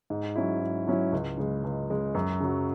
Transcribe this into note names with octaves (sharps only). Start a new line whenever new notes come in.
G#2
F#3 C#4 E4
G#2
F#3 C#4 E4
C#2
C#3 G#3
C#2
C#3 G#3
F#2
C#3 F#3